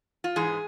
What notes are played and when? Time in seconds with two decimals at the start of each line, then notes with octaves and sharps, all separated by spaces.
0.24 F4
0.36 G#2 E3 G#3 G#4